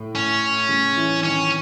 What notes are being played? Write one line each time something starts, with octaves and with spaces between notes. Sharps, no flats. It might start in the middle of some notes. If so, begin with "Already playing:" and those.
Already playing: A2
C#4
C#3
E3
D#3 C#4